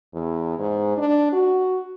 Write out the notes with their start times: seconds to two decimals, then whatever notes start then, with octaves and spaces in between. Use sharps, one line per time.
0.14 E2
0.58 G#2
0.97 D4
1.33 F#4